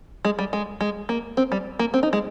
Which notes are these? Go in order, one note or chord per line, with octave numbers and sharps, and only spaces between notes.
G#3
G3
G#3
G#3
A#3
C4
G3
A#3
C4
D#4
G#3